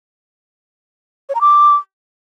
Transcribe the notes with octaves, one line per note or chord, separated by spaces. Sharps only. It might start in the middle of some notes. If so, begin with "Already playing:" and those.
C#5
A#5
D6